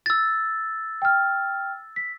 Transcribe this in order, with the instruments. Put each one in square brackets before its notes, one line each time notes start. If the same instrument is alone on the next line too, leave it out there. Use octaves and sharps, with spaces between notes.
[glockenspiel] E6 A6
[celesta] G5 F6
B6